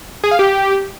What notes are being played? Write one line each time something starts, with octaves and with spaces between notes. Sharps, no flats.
G#4
F5
G4